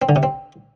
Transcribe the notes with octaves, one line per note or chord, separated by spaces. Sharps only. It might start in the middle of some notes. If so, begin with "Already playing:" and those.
C4
D3
C3
C4